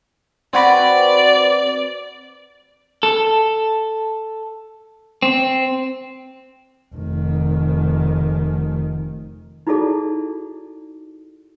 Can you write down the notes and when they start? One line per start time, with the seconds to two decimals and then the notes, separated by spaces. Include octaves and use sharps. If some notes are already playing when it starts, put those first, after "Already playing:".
0.53 C4 F#4 B4 D5
3.03 A4
5.22 C4
6.95 F1 D#3
9.67 D#4 E4 F#4 G#4 A4 D5